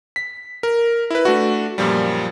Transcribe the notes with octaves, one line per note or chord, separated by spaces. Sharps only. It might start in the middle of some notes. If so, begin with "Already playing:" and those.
B6
A#4
E4 B4
A3 D4 F#4
F#2 A#2 F3 G3